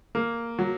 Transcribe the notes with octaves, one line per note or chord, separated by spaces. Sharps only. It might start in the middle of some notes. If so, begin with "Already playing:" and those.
A#3
F#3